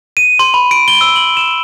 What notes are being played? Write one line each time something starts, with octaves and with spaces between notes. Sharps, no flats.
D#7
C6
B5
D7
G7
E6
F#7
E7